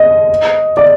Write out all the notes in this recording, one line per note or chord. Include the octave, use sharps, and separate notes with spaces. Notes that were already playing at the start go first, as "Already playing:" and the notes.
Already playing: D#5
D5